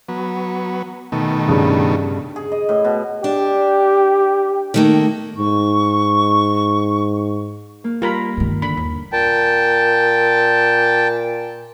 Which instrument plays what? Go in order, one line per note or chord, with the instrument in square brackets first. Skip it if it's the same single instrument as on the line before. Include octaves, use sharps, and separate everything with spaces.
[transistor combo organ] F#3 B3
B2 D#3 A3
[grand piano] G2 C#3
[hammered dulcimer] G#4
D#5
A2
B2
[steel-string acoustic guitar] D4 [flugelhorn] G4
[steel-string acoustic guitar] D#3 A3 A#3
[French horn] G#2 [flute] C#6
[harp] A#3
[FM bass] G3 [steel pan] F4 A#4 B5 [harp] A#5
[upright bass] G2 D#3
[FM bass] D3 [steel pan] B5
[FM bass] D#2
[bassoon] A#2 [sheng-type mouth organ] G5 A5